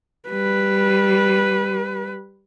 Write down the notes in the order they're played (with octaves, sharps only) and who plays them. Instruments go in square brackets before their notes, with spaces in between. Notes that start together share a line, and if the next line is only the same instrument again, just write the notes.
[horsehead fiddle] G3 B4